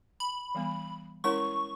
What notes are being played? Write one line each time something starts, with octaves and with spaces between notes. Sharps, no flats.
B5
E3 G3 B3
G#3 C#4 E4 A#4 C#5 C#6